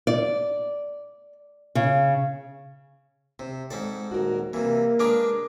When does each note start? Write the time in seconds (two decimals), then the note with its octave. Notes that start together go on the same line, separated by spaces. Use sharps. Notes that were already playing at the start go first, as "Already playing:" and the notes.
0.07 D5
1.75 C#3
3.39 C3 C5
3.71 G#2 C4 A4 D5
4.11 D#1 F#4 A#4
4.53 C3 E3 G3 A#3
4.99 G#3 D4 A#4 B4 D6